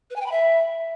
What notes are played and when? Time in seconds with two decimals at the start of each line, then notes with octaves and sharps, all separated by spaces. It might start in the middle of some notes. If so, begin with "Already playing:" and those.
0.10 B4
0.16 G#5
0.21 G5
0.26 B5
0.31 E5